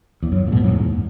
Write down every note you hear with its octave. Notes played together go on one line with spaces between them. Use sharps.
E2
F#2
A#2
G#2 B2
F#2 A#2
E2 G#2